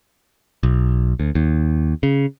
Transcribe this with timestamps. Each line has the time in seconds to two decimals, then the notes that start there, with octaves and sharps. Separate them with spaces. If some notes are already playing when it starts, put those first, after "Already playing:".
0.63 B1
1.20 D2
1.35 D#2
2.03 C#3